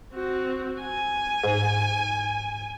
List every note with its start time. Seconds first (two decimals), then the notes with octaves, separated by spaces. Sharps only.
0.14 C4 F#4
0.81 G#5
1.44 G#2